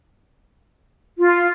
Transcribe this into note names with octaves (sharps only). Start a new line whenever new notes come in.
F4